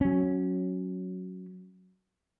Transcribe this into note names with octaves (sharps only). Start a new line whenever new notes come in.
F#3 C#4